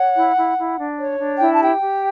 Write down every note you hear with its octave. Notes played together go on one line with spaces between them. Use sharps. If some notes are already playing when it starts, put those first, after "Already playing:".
Already playing: C#5 F#5
E4
E4
E4
D4
C#5
D4
E4 G5
A5
G4 G5
G4